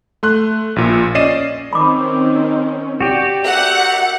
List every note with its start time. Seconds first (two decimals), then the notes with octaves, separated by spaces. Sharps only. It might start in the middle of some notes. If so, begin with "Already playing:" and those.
0.23 A3 C6 F#6
0.76 A#1 A#2
1.15 C#4 D5 D#5 C7 D#7 E7
1.73 D#3 C4 C#4 B5 D6
3.01 F#4 G4 D5
3.46 A#4 D5 E5 F#5